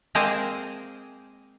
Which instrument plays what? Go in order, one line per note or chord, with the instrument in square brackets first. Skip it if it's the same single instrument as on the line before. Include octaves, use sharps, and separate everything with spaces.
[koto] G#3 A#3 C4 G#4 A#4 C5